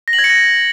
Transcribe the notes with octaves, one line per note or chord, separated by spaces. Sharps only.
A#6
F#7
G#6
C#7
A#6